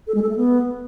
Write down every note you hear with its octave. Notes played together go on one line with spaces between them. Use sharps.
A4
G#3
A4
A3
B3